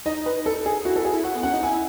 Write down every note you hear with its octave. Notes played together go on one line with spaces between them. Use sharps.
D#4 D#5
B4
A4
G#4
E4 F#4
A4
G#4
E4
F#4 F#5
B3
C#4 F#5
D#4
E4 G#5